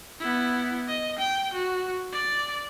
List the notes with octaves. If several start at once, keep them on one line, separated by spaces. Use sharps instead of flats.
B3 E4
D#5
G5
F#4
D5